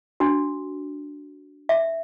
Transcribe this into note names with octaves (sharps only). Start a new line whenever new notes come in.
D4 F#4
E5